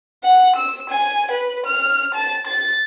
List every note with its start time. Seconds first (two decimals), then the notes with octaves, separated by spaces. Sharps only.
0.24 F#5
0.56 E6
0.90 G#5
1.32 B4
1.66 F6
2.14 A5
2.47 A6